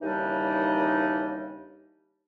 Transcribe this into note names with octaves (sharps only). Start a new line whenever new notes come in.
D#2 C#3 E3 G3 D4 D#4